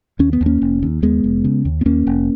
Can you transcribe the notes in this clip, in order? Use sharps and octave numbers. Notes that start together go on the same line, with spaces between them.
D#2 C#4
B3
D#2
A#3 C#4
F1
D#2
D#2 G#3 B3
F1
C#3
D#2
B3
D#2 A#3 C#4
F1